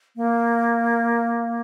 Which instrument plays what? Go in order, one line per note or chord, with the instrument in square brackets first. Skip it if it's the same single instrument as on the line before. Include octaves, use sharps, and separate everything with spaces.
[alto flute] A#3